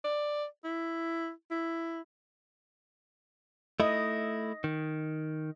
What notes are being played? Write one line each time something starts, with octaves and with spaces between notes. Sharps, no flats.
D5
E4
E4
A3 E4 D#5
D#3